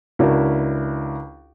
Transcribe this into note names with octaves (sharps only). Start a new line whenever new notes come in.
C#2 D4 E4 F#4 A#4